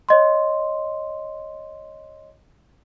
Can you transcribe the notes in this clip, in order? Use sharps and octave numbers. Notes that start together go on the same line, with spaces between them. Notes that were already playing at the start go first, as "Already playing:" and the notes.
C#5 D#5 C6